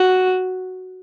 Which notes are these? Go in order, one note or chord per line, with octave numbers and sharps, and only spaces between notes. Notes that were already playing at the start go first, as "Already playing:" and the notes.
Already playing: F#4